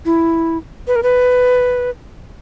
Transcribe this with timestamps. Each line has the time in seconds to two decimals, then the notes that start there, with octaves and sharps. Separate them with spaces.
0.06 E4
0.88 B4
0.96 A#4
1.03 B4